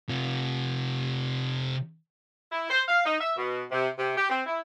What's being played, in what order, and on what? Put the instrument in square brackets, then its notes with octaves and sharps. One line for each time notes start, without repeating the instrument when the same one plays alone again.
[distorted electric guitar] C3 F4
[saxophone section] E4
C5
F5
D#4
E5
B2
C3
C3
G4
C4
E4